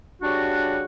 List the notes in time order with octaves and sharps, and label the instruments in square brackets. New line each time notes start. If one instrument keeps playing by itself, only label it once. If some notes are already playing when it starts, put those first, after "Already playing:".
[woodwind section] C#3 G3 D4 F#4